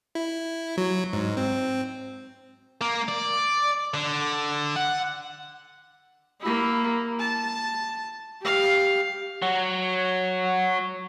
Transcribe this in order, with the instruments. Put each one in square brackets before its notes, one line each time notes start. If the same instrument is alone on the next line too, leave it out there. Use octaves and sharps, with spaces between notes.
[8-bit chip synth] E4
F#3
G#2
C4
[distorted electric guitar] A#3
D5
D3
F#5
[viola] A#3 E4
A5
G4 F5
[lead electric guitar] F#3 F#4